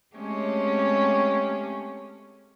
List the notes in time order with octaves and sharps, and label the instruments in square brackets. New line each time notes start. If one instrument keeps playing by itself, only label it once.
[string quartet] G#3 A3 C4 C#4 G4 C#5